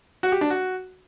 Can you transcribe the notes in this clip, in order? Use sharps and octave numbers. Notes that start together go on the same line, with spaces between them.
F#4
G4
D4
F#4